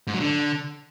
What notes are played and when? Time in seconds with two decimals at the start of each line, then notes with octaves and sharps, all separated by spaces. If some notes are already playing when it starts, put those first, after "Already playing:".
0.07 G#2
0.14 F#3
0.20 D3